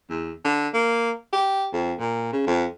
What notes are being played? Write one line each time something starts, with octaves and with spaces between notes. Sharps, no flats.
E2
D3
A#3
G4
F2
A#2
C#3
F2